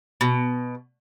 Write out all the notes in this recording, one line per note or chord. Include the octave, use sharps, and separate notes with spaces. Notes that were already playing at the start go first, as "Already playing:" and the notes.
B2